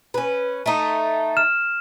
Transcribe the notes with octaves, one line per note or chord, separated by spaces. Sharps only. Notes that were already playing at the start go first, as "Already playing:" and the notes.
C#4 B4
A3 D#4
F6 E7